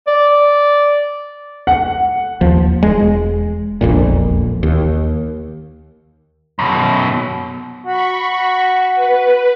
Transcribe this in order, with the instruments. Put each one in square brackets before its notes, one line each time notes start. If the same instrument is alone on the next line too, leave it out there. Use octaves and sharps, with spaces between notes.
[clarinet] D5
[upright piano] F#5
[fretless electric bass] D#2 F3
E1 G#3
E1 A#1 F2 A#2
D#2
[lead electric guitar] F#2 B2
[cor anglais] F#4 [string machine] B5 C#6
[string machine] B4